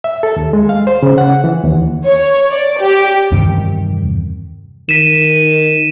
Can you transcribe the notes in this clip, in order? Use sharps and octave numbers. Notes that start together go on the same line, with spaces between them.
E5
A4
D#2
G#3
F5
C5
C#3
F#5
E3
D#2
C#5
D5
G4
E2 G2 C3 D#3
D#3 B6 D#7 E7